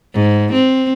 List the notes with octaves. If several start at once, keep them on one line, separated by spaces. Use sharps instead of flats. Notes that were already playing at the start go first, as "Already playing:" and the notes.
G#2
C4